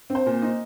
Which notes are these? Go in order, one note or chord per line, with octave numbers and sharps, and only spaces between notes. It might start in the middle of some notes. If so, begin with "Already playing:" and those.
C4
C5
A#2
D#4